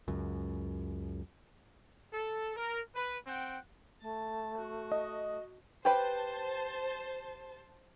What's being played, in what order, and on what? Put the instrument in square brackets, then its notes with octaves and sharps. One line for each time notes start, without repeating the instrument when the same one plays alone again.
[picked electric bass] C#2 F#2
[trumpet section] A4
A#4
B4
C4 F#5 G5
[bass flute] A3 [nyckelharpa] A5
[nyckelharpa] F#4
[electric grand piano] D#5
[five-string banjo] G4 B4 G5 [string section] C5 A5